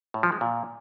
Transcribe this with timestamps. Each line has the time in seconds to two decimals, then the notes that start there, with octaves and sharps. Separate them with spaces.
0.14 A2
0.23 F3
0.32 G#3
0.41 A#2